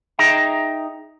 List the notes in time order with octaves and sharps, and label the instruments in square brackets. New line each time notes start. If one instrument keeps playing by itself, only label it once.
[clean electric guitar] D#4 G#4 D#5 E5 G5 A#5